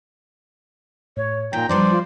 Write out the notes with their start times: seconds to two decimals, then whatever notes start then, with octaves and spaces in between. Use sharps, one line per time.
1.17 A2 C#5
1.53 A#2 D#3 G5 A#5 A#6
1.69 F3 G3 B3 D4 C5 D5
1.91 F4